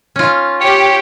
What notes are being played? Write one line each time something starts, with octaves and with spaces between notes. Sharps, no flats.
C#4 F4
G4 C#5